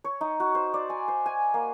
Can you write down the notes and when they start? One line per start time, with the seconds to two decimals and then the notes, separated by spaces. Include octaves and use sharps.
0.04 C#5
0.21 D#4
0.40 F#4
0.55 C5
0.74 D5
0.90 G#5
1.08 C5
1.26 G#5
1.54 A#3